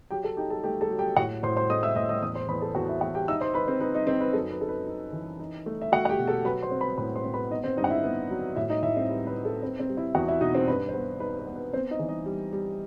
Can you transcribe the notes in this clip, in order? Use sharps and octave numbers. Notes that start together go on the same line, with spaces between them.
F#3 G4 G5
A4 A5
D#4 G4 G5
A4 A5
A3 G4 G5
A4 A5
F#3
G4 G5
A2 F#4 F#5
A2 C5 C6
C5 C6
A3 D#5 D#6
E5 E6
A2 D#5 D#6
D#5 D#6
E2 D#5 D#6
C5 C6
E2 B4 B5
A4 A5
E2 F#4 F#5
E4 E5
E2 F#4 F#5
G4 G5
D#4 E5 E6
C5 C6
D#4 B4 B5
C4 C5
D#4 B4
D#4 D#5
C4 D#4 C5
B4
F#2 A4
B4
D#4 A4
B4
D#4
E3
D#4
A3
E5
A3 F#4 F#5
F#5
G4 G5
B2
A4 A5
F#3 B4 B5
C5 C6
C4
B4 B5
A2 B4 B5
C5 C6
C4
B4 B5
B3 D#4 D#5
C4 C5
G2 D#4 D#5
F#5
E4 E5
B3
F#3
A2 E4 E5
D#4 D#5
A2 E4 E5
C4 C5
G3 B4
B4
D#4
A4
C4 B4
C4 C5
G3
E4 E5
E2 F#4 F#5
E4 E5
B2 D#4 D#5
C4 C5
G2 B4
C5
B3 B4
D#4 B4
B4
B3
B4
B3 C4 C5
D#4 D#5
E3
D#4 D#5
G3
G3